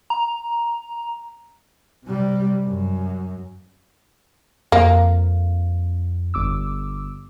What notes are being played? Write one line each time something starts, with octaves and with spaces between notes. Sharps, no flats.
A#5
C3 G3
F#2
F2 A#3
G1 D6 E6